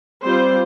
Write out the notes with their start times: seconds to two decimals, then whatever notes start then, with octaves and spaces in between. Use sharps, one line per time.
0.24 G3 C4 F4 C5